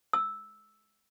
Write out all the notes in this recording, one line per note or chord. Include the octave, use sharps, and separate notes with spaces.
E6